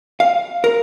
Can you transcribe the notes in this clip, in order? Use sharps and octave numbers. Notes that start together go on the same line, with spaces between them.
F5
A#4